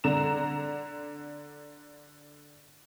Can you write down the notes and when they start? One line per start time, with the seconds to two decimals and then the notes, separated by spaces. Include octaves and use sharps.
0.04 D3 A#5 E7